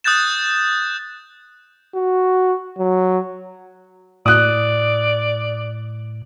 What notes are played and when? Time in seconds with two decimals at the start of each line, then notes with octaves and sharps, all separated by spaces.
0.04 D#6 F#6 G6 A6 E7
1.95 F#4
2.78 F#3
4.26 A2 D5 D#6 F#6